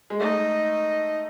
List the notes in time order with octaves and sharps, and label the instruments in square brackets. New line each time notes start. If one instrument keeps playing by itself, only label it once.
[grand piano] G#3
[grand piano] A3 [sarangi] D#4